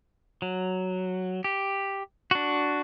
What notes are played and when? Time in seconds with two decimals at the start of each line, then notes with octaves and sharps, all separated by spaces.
0.42 F#3
1.44 G4
2.31 D4 F#4